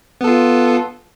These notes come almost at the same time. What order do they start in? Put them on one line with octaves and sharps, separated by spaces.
B3 A4 F4